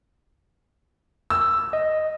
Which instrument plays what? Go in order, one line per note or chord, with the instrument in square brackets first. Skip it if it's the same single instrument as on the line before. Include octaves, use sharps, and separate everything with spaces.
[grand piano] E6
[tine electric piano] D#5